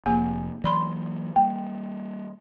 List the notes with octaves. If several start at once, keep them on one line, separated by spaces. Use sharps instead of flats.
F1 F3 A#3 G#4 G#5
E3 F#3 A#3 D5 B5 C6
G3 A#3 G5